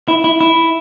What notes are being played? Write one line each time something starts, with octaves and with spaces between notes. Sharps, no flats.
E4
E4
E4